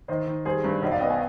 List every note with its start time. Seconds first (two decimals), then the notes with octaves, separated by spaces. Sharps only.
0.08 D#3 C5 D#5
0.27 D#3
0.45 G3 G#4 C5
0.64 G2
0.82 B1 C5 D#5
0.91 D5 F5
1.00 B3 D#5 G5
1.10 F5 G#5